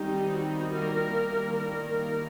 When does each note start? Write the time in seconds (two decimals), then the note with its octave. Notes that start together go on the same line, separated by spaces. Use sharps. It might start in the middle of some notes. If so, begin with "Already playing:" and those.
Already playing: D#3 G3 C4 D#4 G4
0.34 F#4
0.75 D#3 G3 A#3 A#4
1.58 A#4